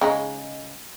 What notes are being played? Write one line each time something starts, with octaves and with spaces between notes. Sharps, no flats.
C#3 G#3 D#4